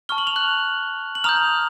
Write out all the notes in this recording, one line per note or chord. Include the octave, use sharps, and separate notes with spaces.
A5 C#6 F6 G7
F#7
F7
F#6 F#7
F#7
A#5 D#6 F6 G6 F7